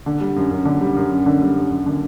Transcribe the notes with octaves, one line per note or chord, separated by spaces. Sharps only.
D3
G3
F#2
F#2
D3
G3
F#2
F#2
D3
G3
F#2
F#2
D3